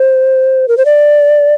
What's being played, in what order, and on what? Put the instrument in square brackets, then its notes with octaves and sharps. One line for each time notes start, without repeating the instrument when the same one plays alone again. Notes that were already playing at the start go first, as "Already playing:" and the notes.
Already playing: [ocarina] C5
A#4
C5
D5